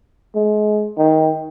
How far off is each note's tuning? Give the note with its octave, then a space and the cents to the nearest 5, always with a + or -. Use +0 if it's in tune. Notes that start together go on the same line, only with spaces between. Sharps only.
G#3 +30
D#3 +20